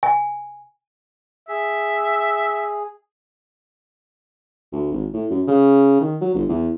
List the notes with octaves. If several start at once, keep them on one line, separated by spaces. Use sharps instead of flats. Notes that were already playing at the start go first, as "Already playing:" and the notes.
G#5
G#4 E5
D2
G#1
A2
F#2
C#3
D#3
F#3
G1
E2